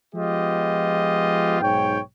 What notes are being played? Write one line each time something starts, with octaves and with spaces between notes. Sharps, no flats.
F3 G#3 B3 F4 G4 D#5
B1 G#2 C#5 G5